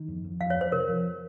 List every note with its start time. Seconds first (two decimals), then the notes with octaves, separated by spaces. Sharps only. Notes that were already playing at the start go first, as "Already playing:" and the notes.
Already playing: D#3
0.08 F2
0.25 F2
0.40 F3 F5
0.50 C#5
0.56 F2 C5
0.72 C3 A#4
0.88 F3